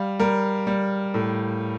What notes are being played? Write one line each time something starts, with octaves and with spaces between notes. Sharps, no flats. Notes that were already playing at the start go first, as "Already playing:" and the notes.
Already playing: G3 F5
G3 A#4
G3
A2